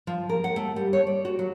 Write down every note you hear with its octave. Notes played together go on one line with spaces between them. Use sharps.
F3
A#4
F#5
A3
G3
C#5
D5
F#4
F#3